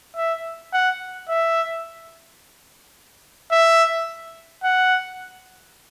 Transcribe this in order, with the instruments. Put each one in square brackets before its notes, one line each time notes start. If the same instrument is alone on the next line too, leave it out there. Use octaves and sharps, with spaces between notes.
[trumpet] E5
F#5
E5
E5
F#5